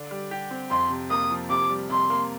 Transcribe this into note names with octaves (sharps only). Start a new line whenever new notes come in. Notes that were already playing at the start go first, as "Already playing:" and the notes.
Already playing: D3 D4
G3
G4
C4
F2 C6
C3
A#3 D#6
F3
C3 D6
G3
C3 C6
A#3